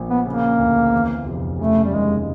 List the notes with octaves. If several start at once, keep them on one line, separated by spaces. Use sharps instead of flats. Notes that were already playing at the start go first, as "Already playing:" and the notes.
Already playing: A#1 A#2
B3
C#3 A#3
D2
E2
F1
C#3 A3
G3
D#2 G#3